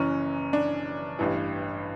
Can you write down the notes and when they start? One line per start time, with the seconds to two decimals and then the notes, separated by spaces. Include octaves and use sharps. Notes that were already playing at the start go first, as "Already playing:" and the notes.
Already playing: F#1 F#2 E3 C#4
0.53 D4
1.19 A1 G2 E3